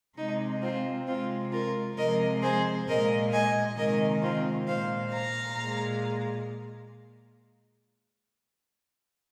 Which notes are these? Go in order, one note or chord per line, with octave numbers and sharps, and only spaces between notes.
C3 G#3 D#4
C4 F4
C3 G#3 C4 F4
F4 A#4
C3 F3 G#3 A#4 D#5
G#4 C5
A#2 G#3 A#4 D#5
D#5 G#5
C3 D#3 G#3 A#4 D#5
C4 F4
A#2 G#3 C5 F5
F5 A#5
A#2 G#3